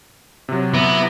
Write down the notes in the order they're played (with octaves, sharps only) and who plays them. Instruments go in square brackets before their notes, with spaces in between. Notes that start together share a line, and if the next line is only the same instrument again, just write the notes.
[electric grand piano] C3 F#3
[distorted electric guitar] B3 [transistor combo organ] E4 A#5 D6